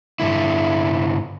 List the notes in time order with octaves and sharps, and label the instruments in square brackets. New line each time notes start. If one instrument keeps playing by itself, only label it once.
[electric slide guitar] G2 D3 E4